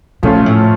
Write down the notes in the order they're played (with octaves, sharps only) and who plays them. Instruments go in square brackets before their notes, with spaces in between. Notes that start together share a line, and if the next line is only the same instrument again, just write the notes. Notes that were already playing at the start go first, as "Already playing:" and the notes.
[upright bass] A#2 [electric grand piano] F3 A3 C#4 F4
[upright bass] A2